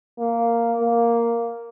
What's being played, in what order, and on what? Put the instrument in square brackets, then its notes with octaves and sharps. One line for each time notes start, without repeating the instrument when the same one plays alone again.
[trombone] A#3
A#3